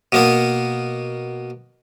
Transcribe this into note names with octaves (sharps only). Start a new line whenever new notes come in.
B2 A#3 B3